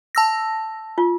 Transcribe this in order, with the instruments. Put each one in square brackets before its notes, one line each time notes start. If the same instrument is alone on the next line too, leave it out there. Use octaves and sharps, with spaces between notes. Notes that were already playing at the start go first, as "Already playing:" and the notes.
[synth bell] A5 E6 A#6
[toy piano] F4